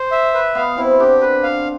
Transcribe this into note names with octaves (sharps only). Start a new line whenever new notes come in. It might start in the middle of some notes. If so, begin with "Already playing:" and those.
Already playing: C5
E5
B4
B2 B3 F5
C3 C4 E4
C4
D3 D4 G4
B4
F5